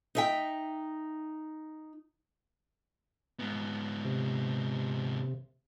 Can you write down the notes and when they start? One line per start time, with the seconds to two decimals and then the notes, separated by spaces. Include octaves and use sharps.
0.15 D#4 E5 G5
3.39 G#2 B3
4.05 C3